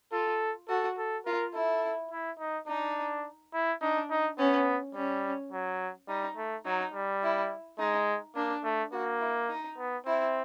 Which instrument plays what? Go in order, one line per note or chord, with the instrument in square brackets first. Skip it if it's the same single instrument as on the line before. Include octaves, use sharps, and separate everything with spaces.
[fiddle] F4 [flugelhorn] A4
[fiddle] F#4 [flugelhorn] A4
[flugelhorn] A4
[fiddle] F4 [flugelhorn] A#4
[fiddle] E4 [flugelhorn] A4
[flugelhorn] E4
D#4
[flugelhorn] D4 [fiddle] D#4
[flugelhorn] E4
[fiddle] D4 [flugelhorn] D#4
[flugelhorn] D#4
[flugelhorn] B3 [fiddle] C#4
[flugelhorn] G3 [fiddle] C#4
[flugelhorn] F#3
[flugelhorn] G3 [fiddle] D#4
[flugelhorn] A3
[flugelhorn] F#3 [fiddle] D#4
[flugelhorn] G3
[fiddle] E4
[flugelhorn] G#3 [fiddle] D#4
[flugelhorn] A#3 [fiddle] D4
[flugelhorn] A3
[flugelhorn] A#3 [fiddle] F#4
[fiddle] E4
D#4
[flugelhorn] B3
[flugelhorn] C4 [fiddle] E4